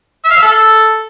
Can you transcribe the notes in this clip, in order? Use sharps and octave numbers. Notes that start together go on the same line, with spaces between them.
E5
F5
E5
A4